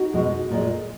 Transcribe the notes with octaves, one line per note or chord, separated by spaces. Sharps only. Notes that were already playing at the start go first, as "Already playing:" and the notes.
Already playing: D#4 F#4
B2 G#3
A#2 G#3